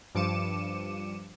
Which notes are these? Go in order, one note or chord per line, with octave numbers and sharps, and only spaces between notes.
G2 F3 D6 C#7 D#7 E7